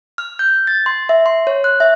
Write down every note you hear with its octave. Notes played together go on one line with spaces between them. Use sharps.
F6
G6
A6
C6
E5
C6
C#5
F#6
E5